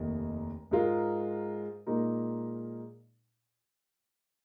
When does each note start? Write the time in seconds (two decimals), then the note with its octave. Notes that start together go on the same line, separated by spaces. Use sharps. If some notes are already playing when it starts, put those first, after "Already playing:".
Already playing: F1 D#2 D#3
0.71 G#2 G#3 F4 A#4
1.86 A#2 G#3 D#4 A#4